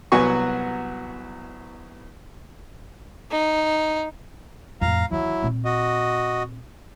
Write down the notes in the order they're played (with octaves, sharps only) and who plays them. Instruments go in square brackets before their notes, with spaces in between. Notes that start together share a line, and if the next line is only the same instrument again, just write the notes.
[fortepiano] C2 F#3 B3 F#4 G#5 C#6
[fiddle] D#4
[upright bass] F2 A2 [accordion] F5 A#5
[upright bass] D#2 E3 [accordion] F#3 E4
[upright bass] A#2 C4
[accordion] F#4 D#5